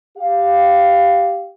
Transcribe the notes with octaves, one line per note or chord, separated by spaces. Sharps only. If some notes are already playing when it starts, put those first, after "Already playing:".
G4 F5